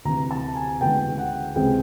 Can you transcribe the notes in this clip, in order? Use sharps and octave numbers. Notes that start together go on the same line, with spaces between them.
D2 C3 E3 A#5
A5
G#5
D2 C#3 E3 G#3 B3 G5
F#5
C#2 C3 E3 G#3 C4 G5